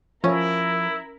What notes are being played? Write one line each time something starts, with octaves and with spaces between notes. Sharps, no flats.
F3 C#4 E4 A#4